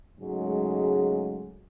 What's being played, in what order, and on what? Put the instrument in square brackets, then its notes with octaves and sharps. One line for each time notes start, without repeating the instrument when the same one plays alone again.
[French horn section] G#2 C#3 F#3 G#3 A3